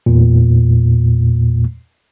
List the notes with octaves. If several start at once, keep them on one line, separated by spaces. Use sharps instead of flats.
E2 A#2